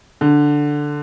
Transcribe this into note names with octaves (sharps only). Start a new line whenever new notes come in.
D3